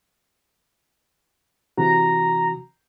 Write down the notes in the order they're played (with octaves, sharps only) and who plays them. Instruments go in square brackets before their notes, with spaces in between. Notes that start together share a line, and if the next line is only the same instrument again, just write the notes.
[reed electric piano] C3 E3 F#4 [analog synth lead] A#5